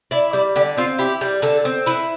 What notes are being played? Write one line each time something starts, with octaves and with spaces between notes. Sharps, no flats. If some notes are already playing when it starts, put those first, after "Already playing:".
E4 D5
G3 D5
D3 G4
C4 F4
E4 G4
G3
D3 A4
C4
E4 B4